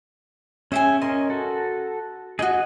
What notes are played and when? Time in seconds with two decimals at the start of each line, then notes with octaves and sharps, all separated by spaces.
0.72 C#4 G#4 E5 G5 G#5
1.02 C#4 A#4 D#5 C6
1.30 F#4 A4
2.39 D#4 F#4 G#4 D#5 D#6